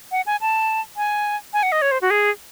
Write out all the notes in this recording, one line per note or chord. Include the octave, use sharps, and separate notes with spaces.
F#5
G#5
A5
G#5
G#5
F#5
D#5
C#5
C5
F#4
G#4